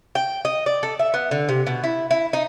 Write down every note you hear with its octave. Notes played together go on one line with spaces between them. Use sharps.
G5
D#5
D5
A4
E5
B3
D3
C3
B2
E4
E4
D#4